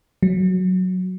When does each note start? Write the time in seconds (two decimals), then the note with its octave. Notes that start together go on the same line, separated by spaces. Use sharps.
0.23 F#3